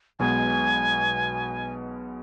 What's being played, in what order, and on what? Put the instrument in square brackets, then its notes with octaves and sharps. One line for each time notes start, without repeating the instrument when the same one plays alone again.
[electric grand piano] B1 B2 G#3 B3 [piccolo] G#5